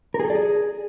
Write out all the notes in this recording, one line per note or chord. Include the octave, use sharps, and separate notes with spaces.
A#4
G#4
A4
D5
G#4